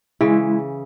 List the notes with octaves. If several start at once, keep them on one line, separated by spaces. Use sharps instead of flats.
C#3 E3 G#3 E4